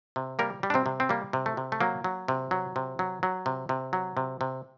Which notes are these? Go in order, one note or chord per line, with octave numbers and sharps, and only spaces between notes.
C3
G3 A#3 A#4
G3
D4
C3 C4
C3
C4
G3 A#3
C3
A3
C3
A3
F#3 A#3
F#3
C3
F#3
C3
F#3
F#3
C3
C3
F#3
C3
C3